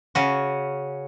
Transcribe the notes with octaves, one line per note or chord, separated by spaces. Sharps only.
C#3 C#4 F#4